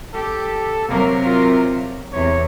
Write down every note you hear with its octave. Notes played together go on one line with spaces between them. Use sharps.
G4 A4
C3 F#3 A#3 A#4
F4
E2 C3 C#5